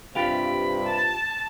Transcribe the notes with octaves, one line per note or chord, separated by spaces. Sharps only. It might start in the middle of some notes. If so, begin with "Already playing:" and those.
G2 C3 F4 G4 F5 B5
A5